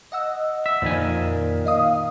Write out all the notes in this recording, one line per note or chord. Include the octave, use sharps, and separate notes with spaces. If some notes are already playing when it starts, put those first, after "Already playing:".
D#5 F#5 E6
E5
F2 A#2 D#3 G#5
D#5 F5 D#6